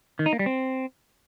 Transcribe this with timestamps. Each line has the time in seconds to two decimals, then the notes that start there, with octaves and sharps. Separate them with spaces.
0.19 D#3
0.26 D#4
0.33 A#3
0.39 G3
0.46 C4